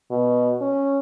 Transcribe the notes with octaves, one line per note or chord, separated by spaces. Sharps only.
B2
C#4